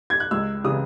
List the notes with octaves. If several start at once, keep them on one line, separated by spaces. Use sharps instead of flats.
G#6
F#6
C#2 E6
C#3 E3 D#6